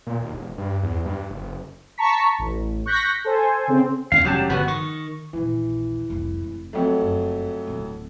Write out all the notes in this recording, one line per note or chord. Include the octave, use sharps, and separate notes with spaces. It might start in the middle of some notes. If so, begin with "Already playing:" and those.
A#2
D#2
E1
G2
E2
G2
F#1
A5 A#5 C#6 B6
A1
C#6 F#6 G6 A#6 B6
A4 C5 G#5
C#3 C4
D#2 C4 C#4 F5
F1 F#3 G3 C#4 G4 A5
G1 C#3 F3 B3 F#4 B4
D#3 C#6
A#1 D#2 E3
F1 C2
F1
F2 F#3 A3
F#1
D1 E4